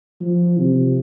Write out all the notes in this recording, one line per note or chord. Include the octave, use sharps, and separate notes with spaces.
F3
C3